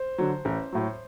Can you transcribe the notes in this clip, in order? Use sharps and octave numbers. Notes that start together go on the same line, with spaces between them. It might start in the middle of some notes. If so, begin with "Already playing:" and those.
Already playing: C5
D3 F#3
A1
A2 F#3